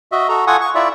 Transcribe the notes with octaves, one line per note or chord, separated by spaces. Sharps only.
F#4 D#5 E5
F#4 A4 A#5
F4 A4 F#5 G#5 C#6 D#6
C#6
E4 F4 D5 E5